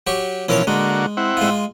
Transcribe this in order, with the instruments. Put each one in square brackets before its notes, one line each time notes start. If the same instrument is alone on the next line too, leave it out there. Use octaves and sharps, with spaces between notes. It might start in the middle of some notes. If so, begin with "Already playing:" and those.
[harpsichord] F#3 G4 C#6
[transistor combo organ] B2 E3 F3 [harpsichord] C#4 A#4 C#5
[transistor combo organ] D3 A#3 F#4 [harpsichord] G#3
[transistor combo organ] C4 E4 F#5
[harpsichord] G#3 F4